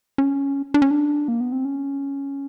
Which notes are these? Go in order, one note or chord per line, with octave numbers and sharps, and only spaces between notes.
C#4
D4
C#4
D4
A#3
B3
C4
C#4